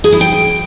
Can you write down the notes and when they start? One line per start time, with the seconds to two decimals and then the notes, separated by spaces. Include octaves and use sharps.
0.04 G#4
0.12 E4
0.21 G5